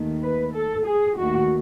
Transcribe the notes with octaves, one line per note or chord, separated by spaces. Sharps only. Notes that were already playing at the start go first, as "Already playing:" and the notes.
Already playing: D#2 D#3 A3
B4
A4
G#4
D#2 D#3 A3 F#4